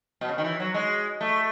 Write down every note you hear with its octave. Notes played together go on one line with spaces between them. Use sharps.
B2
C#3
D#3
E3
F#3
G#3
A3